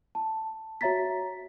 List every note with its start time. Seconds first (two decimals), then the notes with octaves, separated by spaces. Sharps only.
0.15 A5
0.81 F#4 C#5 E5 A#5 A6 B6